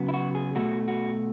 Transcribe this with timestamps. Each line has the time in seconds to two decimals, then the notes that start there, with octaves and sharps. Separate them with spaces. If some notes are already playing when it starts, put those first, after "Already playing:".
Already playing: C#3 F#3 B3
0.09 E4
0.14 F#4
0.35 G#4
0.55 B2 A3 F#4
0.88 F#4